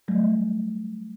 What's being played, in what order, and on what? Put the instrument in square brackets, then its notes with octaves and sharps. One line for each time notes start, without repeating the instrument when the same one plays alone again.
[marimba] F#3 G3 A3